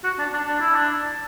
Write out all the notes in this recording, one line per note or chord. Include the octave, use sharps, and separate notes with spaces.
F#4
D4
D4
D4
E4
D4